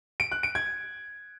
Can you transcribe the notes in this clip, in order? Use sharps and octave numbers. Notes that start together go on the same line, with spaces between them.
D7
F#6
D7
G#6